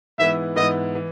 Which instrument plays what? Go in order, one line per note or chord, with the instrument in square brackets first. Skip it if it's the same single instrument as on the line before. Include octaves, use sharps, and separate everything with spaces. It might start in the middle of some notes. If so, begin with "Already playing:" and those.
[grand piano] G#2 E3 B3 E4 [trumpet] E5
[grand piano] G#2 E3 B3 E4 [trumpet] D#5
[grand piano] E3